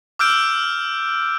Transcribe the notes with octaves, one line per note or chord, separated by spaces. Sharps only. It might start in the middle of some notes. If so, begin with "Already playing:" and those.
D6 E6 F6 G6 D7